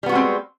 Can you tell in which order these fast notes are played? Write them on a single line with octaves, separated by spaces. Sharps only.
G3 B3 F#4 G#3 C4